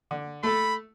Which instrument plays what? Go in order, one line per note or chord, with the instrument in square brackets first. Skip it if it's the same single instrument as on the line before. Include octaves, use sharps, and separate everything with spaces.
[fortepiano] D3
[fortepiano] A3 A4 [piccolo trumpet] B5